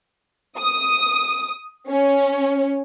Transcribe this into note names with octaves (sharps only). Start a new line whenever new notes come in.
D#6
C#4